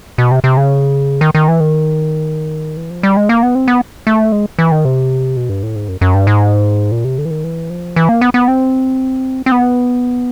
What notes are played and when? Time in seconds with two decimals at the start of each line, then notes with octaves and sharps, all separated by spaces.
0.18 B2
0.31 C3
0.44 C3
0.57 C#3
1.21 D#3
1.35 D#3
1.48 E3
1.60 D#3
2.77 E3
2.90 F3
3.03 G3
3.17 G#3
3.29 A#3
3.43 B3
3.55 C4
3.68 B3
4.07 A3
4.32 G#3
4.59 E3
4.72 D#3
4.85 C3
5.37 B2
5.49 G2
5.63 A2
5.76 G#2
5.88 F#2
6.01 F#2
6.14 G2
6.27 G#2
6.92 A#2
7.04 C3
7.18 D3
7.25 E3
7.31 D#3
7.44 E3
7.70 F3
7.96 E3
8.09 A#3
8.21 B3
8.34 B3
8.48 C4
9.46 C4
9.52 B3